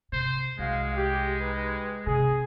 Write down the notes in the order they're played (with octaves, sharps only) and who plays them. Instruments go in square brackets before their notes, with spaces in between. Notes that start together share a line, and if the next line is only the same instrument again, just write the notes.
[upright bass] C3 [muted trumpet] C5
[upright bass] C2 [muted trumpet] G#3 [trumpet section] F#4 F5
[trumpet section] G4
D#4 G4 B4
[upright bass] C3 [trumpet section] G#4